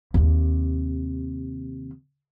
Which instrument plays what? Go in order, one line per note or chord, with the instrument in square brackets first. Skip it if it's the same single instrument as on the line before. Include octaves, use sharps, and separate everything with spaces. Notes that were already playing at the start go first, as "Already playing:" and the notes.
[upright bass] D#2 C3